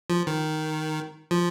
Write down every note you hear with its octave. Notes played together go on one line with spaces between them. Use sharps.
F3
D#3
F3